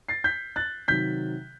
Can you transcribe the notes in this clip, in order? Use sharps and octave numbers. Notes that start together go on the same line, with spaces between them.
A6 C7
G6 B6
F#6 A6
C3 D#3 F#3 G6 B6